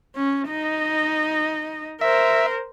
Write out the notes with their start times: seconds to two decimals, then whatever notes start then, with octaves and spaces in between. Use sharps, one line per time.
0.15 C#4
0.49 D#4 D#5
2.01 A#4 C5 E5